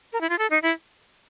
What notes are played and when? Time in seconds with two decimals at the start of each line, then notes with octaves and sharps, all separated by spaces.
0.13 A#4
0.21 E4
0.30 F4
0.39 A4
0.50 D#4
0.63 E4